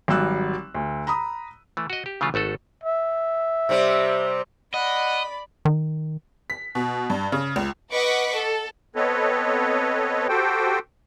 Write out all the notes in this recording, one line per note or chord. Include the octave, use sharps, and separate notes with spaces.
G#1 F#3 G3 E6 F#6
D2
A#5 B5 D#6
E3 A3
F#4 D#5
G4
C#3 E3 F#3 A3 F4
G#1 A3 F#4 A4
E5
C3 G3 C4
D5 D#5 F#5 B5
D#3
B6
B2
G2
C#3
C#2
B4 D#5 F#5 C#6 D6 B6
A4
B3 C4 A4 B4 C#5 D#5
F#4 G4 A4 C5 G5